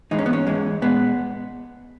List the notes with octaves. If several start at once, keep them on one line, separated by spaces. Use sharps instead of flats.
G#2 E3 G#3 D#4
C#4
B3
C#4
G#2 E3 G#3
A#2 G#3 B3